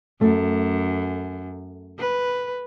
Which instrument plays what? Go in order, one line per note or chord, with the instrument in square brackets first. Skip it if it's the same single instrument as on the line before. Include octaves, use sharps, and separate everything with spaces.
[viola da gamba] F#2 [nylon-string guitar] A3
[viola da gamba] B4